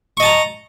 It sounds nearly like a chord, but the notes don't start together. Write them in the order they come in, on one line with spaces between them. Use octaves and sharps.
C#6 D#5 A5 A#5